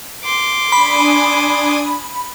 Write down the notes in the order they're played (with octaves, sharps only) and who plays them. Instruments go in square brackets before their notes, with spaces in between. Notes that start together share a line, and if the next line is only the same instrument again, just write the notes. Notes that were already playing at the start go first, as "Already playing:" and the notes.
[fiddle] C6 D6
[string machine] D4 G#5 D#6 [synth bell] B5